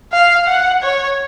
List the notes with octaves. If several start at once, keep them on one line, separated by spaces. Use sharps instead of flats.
F5
F#5
C#5